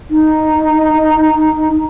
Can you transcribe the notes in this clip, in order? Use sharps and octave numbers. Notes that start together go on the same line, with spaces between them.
D#4